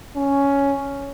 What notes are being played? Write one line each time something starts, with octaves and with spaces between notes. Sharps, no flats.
C#4